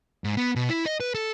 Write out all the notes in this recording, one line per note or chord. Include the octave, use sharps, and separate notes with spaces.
G#2
B3
B2
E4
D#5
B4
A4